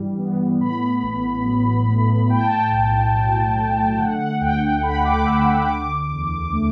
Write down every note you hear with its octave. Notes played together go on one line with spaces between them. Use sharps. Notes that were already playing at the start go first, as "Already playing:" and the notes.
Already playing: G2 E3 G3
B3
A2 B5
A1
F#3
A3
A2 G5
A5
G5
B1
F#3
A3
D3 F#5
F#5
D2 G5
G5
A3 B5
D6
D2 E6
D6
D3 D6
E2
A3